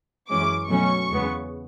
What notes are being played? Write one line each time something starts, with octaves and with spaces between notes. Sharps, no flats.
F#2 E3 G#3 C#4 D6
B2 F#3 A3 C#4 C#6
E2 C#3 G#3 B3